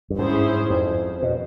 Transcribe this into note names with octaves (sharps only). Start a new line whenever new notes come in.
G2
G#2 C#4 E4 G#4 C5
F2
B2